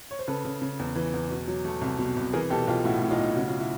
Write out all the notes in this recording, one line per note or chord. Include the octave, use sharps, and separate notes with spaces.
C#5
C5
C#3 A4 B4
C#3
C#3
E2
E3
E2
B2
F#3
A3
C2
B2
C2
E3 G#4 A#4
B1 G4 A4
B1 F4 G4
A2 E4 F#4
A2
D#4 F4
B1
C#3 F#4
F4
E4 F#4